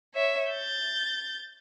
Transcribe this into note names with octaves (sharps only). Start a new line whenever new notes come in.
C#5 E5
G6 A6